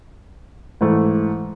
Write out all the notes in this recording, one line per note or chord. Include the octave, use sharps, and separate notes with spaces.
G#2 E3 A3